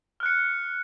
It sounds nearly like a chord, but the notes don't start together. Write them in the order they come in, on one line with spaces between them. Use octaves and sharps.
F6 F#6 C#7